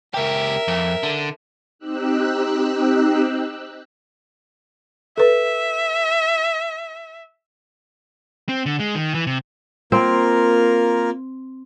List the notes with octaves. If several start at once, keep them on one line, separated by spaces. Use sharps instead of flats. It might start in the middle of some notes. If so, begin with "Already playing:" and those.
C#2 G4 A#4 E5
F2
D3
C4 D#4 G4 E6 F#6
A4 B4 E5
C4
D3
G#3
D#3
E3
C3
A#3 C4 F4 A#4